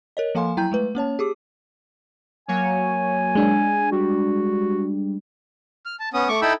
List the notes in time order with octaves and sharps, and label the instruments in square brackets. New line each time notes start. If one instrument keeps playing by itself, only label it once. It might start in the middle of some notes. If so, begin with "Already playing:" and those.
[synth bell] A#4 C#5 D#5
F3 A#3 A4 F5 G#5 C6
F#3 E4 G5 A#5 G6
G#3 A3 B4
A#3 C#4 C#5 A5
G4 G#4 D6
[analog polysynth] F#3 A#3 C#5 [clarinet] G#5
[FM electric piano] G#3 D4
[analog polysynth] G3 [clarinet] F#4
[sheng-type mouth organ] F6
A5
B3 C#4 D#6
A3 C#6 D6
D#4 E4 A4 G5 B5 E6